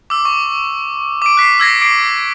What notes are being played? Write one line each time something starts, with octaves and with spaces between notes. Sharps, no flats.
D6 E6
C#6
D6 D7
F#6 B6 C7
E6 G#6 A#6 C7
D6 C7 D7